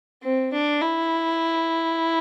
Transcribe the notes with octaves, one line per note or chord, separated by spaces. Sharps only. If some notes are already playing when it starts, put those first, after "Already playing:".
C4
D4
E4